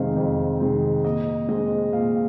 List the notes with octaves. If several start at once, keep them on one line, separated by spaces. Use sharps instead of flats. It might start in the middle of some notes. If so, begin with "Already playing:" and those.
Already playing: F2 C3 D#3 G#3 C4 F5
F2
C3 D#3 G#3 C4
A#2 D#5
G#3 C4 D#5
A#2 F5